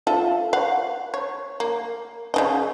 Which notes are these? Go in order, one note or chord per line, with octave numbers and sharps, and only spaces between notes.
F4 A4 E5
F5 F#5
C#5
A#3
C#3 E3 D#5